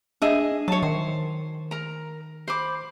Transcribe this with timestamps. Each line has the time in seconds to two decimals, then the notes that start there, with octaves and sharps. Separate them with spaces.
0.22 D4 G#4 D#5 E5
0.68 F#3 C#5 A5
0.83 D#3 C5
1.71 A#4 A#5
2.48 C5 B5 D6